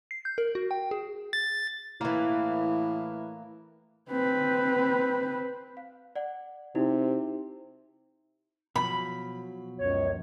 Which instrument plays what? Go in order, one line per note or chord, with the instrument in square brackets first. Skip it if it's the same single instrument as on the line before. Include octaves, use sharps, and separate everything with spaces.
[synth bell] C7
G6
A#4
F#4
G5
G#4
[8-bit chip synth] A6
[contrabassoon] A2 [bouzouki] E3 A#3
[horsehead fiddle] C4 B4
[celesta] F5
D5 F#5
[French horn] C3 [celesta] D#4 E4 F#4
[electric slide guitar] B2 F3 F#3 [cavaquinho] B5
[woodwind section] C#2 F#2 C#5